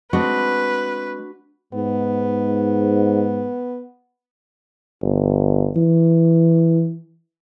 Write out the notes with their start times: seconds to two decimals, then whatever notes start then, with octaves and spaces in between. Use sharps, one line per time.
0.13 G#3 C4 D4 F#4 B4
1.74 G#2 B3
5.02 G1
5.76 E3